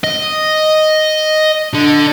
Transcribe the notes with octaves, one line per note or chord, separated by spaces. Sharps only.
D#5
D3